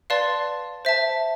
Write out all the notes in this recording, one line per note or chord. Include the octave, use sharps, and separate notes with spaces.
B4 D5 F5 A5 C6
C5 E5 A5